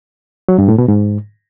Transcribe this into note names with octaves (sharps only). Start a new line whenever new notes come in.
F#3
G2
A2
B2
G#2